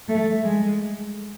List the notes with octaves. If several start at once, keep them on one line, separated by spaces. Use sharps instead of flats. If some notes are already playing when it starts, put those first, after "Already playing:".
A3
G#3